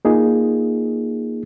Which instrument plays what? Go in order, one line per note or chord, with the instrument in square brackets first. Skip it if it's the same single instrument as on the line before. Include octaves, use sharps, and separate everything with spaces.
[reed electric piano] A#3 D#4 F4 G#4